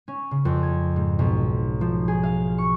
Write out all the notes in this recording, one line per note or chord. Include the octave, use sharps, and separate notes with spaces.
C#4
C#3
F2
G#6
G#2
B1
F3
G#4
F5
C#6